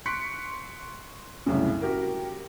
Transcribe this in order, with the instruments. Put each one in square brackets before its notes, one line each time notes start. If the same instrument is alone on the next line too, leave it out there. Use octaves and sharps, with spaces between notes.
[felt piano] C6 C#6 F#6 B6 C#7 D7
C2 F#2 A2 C#3
F#4 G4 A#4